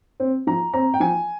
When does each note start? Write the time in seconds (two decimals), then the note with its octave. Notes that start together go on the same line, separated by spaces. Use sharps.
0.20 C4
0.47 F3 A#5
0.74 C4 A#5
0.94 G5
1.00 F3 G#5